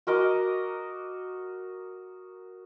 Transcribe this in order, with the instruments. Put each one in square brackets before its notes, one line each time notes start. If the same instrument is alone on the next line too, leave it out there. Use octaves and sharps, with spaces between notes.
[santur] F#4 A#4 D#5 D6